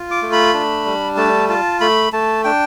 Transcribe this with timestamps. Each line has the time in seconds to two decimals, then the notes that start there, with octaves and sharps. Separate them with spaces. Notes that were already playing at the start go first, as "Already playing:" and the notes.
Already playing: F4
0.11 D6
0.22 A3
0.32 B5
0.54 D4
0.85 G3
1.17 A3 A5
1.49 F4 A5
1.80 A3 B5
2.12 A3 A5
2.44 D4 G5